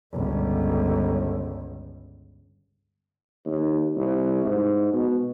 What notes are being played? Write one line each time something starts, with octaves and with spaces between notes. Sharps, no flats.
G1 C#2
D#2
C2
G#2
B2